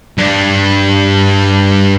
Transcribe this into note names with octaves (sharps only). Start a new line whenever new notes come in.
G2 D4